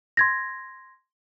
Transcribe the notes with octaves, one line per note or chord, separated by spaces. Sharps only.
C6 G#6 A#6